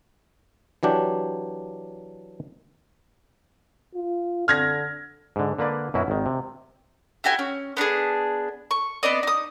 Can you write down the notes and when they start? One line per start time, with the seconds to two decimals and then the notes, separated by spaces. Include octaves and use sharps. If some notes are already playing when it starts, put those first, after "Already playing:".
0.83 E3 F#3 D4 G4
3.95 F4
4.48 D3 F6 G#6 A#6
5.36 G#2 D3
5.59 D3 A#3 B4 D5
5.94 F#2 B2 C#4 E4 F#4
6.08 G#1 D#3
6.26 C3
7.24 E4 F#4 G4 G#5
7.39 C#4
7.77 B3 D4 D#4 G#4
8.71 C#6
9.03 B3 C4 D5 D#5
9.23 D#4 D#6